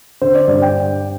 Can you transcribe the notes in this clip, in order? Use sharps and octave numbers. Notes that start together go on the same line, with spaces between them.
D3 C5
D5
G2 D5
G5